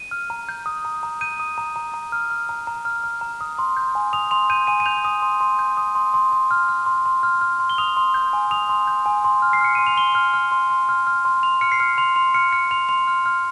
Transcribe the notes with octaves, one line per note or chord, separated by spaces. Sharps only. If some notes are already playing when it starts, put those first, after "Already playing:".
Already playing: D#7
F6
A#5
G6
D#6
A#5
A#5
G6 D#7
D#6
A#5
A#5
A#5
F6
F6
A#5
A#5
F6
F6
A#5
D#6
C6
G6
G#5
D#6 F7
C6 F7
G6 D#7
G#5 D#7
D#7
G6 F7
D#6
C6
C6
G6
D#6
C6
C6
C6
F6
F6
C6
C6
F6
F6
C6
G7
D#6 F7
C6
G6
G#5
D#6 F7
C6
G6
G#5
C6
F6
C7
F6 C#7
C6 D#7
F7
C6 G7
F6
F6
C6
C6
F6
F6
C6
C6 F7
F6 C#7
C7
F6 C#7
C6 F7
C6 F7
F6 C#7
F6 C#7
C6 F7
C6 F7
F6
F6